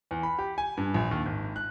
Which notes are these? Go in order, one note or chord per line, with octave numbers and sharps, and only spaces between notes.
E2
B5
G4
G#5
G2
A#1
D#2
G#1
F#6